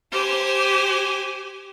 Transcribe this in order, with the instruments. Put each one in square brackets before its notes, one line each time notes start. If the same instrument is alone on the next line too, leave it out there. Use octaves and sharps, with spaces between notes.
[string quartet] G4 C5 G#5